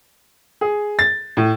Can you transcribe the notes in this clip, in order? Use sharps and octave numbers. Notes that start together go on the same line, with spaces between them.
G#4
A6
A2